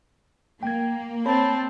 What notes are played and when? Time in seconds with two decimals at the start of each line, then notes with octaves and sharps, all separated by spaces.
0.63 A#3 G5 G#6
1.26 C4 C#5 A5 B5